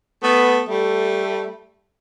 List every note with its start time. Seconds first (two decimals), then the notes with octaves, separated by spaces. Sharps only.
0.22 A3 B3
0.68 G3 A3